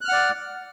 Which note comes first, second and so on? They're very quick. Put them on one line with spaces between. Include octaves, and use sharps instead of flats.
F#6 F6 F#5 D5